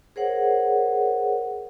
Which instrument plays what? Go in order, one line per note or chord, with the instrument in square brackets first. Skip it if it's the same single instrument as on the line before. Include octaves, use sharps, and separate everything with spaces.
[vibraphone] G#4 A#4 C5 C#5 F#5